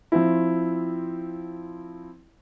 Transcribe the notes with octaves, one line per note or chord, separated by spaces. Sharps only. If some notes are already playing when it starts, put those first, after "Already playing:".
F3 C4 E4